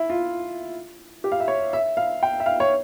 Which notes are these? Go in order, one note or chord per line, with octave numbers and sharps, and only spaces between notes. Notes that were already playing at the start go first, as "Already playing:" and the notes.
Already playing: E4
F4
G4
F5
E5
C#5
E5
F5
G5
E5
F5
C#5